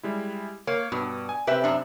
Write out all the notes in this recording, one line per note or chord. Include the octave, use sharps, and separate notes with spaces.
G3 G#3 E4
A#3 C#5
G2 B2
G#5
C3 C4 G4 B4 E5
F#2 D4